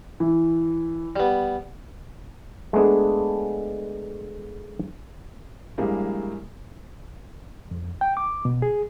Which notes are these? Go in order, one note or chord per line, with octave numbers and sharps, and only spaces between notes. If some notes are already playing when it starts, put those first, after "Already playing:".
E3
G3 B3
G#3 A3 B3 D4 G#4
A#1 G3 G#3 A#3 E4 G4
F2
G5
D6
B2
G#4